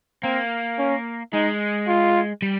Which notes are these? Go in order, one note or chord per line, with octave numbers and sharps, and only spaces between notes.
A#3 C4
C#4
G#3 D#4
F4
G3